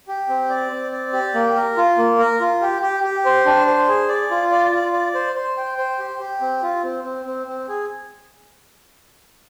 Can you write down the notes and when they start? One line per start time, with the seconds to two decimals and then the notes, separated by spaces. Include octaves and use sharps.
0.08 G4
0.29 C4
0.50 D5
0.71 C4
0.92 D5
1.13 G4
1.34 A#3
1.56 A#4
1.77 F4
1.98 A#3
2.19 A#4
2.40 F4
2.61 G4
2.82 G4
3.03 G4
3.25 C5
3.46 D4
3.67 C5
3.88 G#4
4.09 D5
4.31 F4
4.51 D5
4.72 F4
4.93 D5
5.14 C5
5.35 C5
5.57 G5
5.78 C5
5.99 G4
6.20 G4
6.41 C4
6.63 F4
6.83 C4
7.04 C4
7.25 C4
7.47 C4
7.68 G#4